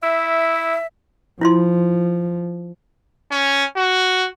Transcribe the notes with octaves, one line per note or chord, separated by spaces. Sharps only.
E4 E5
F3 E4 F4 C6
C#4
F#4